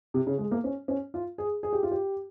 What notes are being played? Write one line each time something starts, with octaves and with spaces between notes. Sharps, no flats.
C3
C#3
G#3
A#3
C#4
C#4
F4
G#4
G#4
G4
F4
G4